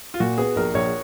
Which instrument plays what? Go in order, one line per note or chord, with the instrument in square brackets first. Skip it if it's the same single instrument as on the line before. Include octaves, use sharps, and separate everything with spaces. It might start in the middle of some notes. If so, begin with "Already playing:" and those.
[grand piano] F4
[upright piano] A#2 [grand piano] F#4
[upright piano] B3 [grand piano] G#4
[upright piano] A#1 [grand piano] A#4
[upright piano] A#1 [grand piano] C#5